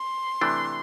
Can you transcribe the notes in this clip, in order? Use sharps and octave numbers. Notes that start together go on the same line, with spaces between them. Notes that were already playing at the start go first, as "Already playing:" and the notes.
Already playing: C6
C3 E3 A3 D4